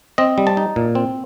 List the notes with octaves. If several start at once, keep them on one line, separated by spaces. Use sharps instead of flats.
C4 D#5
G3
A5
D#4
A#2
C4